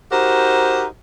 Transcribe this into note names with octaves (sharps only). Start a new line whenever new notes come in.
D#4 F#4 G4 A#4 C5